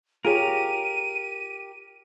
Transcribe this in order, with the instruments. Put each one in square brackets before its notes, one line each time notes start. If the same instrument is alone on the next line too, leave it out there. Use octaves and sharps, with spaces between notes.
[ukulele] F4 G#4 C#5 [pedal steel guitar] G4 A#4 [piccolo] D#7